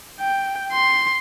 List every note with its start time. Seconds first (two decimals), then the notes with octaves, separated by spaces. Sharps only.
0.20 G5
0.72 C6